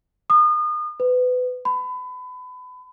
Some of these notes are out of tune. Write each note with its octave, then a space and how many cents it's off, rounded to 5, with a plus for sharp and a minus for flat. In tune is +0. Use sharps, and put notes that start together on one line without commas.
D#6 -35
B4 +25
B5 +30